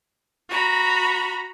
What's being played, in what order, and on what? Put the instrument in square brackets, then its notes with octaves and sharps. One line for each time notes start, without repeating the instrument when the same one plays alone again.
[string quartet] F#4 A#5 B5